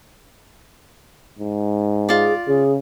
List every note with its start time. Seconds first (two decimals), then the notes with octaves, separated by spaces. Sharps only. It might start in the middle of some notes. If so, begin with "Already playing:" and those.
1.39 G#2
2.09 F4 G#4 D5
2.48 C#3 G#4